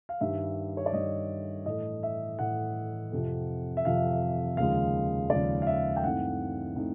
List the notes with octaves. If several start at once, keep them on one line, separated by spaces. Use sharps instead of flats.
F5
G2 D#3 G3 E5
C#5
D5
G2 D#3 G3 D#5
A2 E3 A3 D#5
E5
A2 E3 A3 F#5
F2 C3 F3
E5
F2 C3 F3 F5
D#2 C#3 F3 G#3 F5
D#2 C#3 F3 G#3 D5
F5
E5
G5
G2 E3 A3 C4 D#4 F#5
E3 A3 C4 D#4